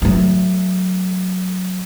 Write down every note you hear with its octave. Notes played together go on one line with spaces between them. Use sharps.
F#3 A3